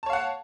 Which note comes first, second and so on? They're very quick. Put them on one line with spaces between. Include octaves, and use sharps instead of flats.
A5 C#5 F5 F#5